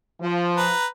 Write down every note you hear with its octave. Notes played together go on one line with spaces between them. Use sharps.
F3
B4 A#5